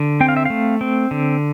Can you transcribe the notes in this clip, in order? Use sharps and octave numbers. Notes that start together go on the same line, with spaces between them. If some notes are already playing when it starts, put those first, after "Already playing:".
Already playing: D3
C4 G5
F5
E5
A3 F5
C4
D3